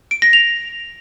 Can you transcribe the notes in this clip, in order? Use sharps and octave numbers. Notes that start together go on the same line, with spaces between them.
D7
A#6
F7